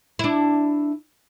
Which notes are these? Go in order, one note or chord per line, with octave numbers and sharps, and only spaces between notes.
D4 E4